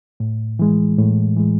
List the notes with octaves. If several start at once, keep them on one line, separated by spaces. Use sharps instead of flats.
A2
E3 G#3
A2
E3 G#3